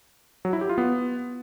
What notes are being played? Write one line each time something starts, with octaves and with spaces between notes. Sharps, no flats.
F#3
E4
G4
F4
B3